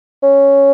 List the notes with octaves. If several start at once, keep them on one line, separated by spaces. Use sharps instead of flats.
C#4